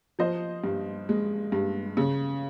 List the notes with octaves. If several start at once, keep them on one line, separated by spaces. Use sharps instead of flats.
F3 C5 D#5
G2
G#3
G2
C#3